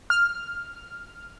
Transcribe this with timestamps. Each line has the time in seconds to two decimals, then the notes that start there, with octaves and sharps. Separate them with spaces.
0.10 F6